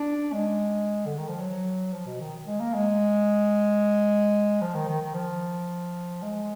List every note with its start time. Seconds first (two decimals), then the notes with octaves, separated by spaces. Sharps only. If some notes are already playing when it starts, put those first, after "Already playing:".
Already playing: D4
0.33 G#3
1.06 D3
1.18 D#3
1.28 F3
1.40 F#3
1.93 F3
2.06 B2
2.20 D#3
2.46 G#3
2.60 A#3
2.74 G#3
4.61 F3
4.75 D#3
4.88 D#3
5.02 D#3
5.14 F3
6.22 G#3